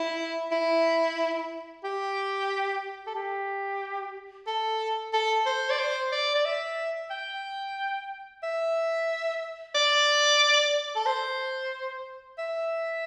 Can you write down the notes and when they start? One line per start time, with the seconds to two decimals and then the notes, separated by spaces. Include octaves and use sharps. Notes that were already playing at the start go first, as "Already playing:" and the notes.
Already playing: E4
0.52 E4
1.84 G4
3.07 A4
3.15 G4
4.47 A4
5.13 A4
5.46 C5
5.70 D5
5.79 C5
6.12 D5
6.35 D5
6.45 E5
7.11 G5
8.43 E5
9.75 D5
10.96 A4
11.06 C5
12.38 E5